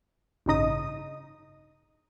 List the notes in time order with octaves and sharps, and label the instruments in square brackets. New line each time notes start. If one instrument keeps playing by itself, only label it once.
[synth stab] A1 G2 C#3 D#4 D#5 D#6